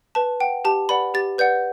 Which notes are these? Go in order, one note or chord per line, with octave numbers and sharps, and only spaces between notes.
B4 A5
F#5 G5
G4 A5
B4 D5 F#5 B5
G4 A6
B4 D5 F#5 G6